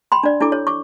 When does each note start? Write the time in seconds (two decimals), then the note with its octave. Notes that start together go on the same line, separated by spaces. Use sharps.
0.12 G5 B5 C6
0.23 D4 D5
0.41 D4 E4 A4 D6
0.52 C#5
0.67 C#6 D6